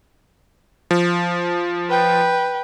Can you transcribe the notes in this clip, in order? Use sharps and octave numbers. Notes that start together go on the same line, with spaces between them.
F3
B4 G5